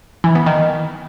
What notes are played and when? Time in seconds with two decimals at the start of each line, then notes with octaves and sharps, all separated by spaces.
0.24 E3
0.35 B3
0.46 D#3